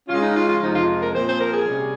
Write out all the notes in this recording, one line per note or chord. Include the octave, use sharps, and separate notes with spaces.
C#3 G#3 C#4 F4
D#4
F4
F4
F2 C3 F3 G#3 D#4
F4
A#4
A#2 F3 C4 C5
C5
A#4
G#4
C3 G3 C#4